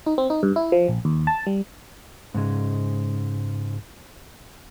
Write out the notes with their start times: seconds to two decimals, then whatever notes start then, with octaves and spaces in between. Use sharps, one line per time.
0.06 D#4
0.18 C4
0.30 D#4
0.43 G2
0.56 E4
0.72 F3
0.88 A#1
1.05 D#2
1.27 A5
1.46 G3
2.34 G#2 C#3 G#3